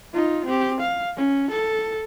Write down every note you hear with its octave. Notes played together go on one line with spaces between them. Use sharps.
D#4 F4
C4 G4
F5
C#4
A4